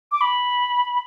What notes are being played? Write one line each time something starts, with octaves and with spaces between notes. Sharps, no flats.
D6
B5